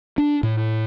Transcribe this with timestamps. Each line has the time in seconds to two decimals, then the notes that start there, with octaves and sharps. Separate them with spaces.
0.18 D4
0.43 A2